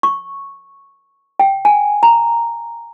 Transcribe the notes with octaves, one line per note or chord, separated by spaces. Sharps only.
C#6
G5
G#5
A#5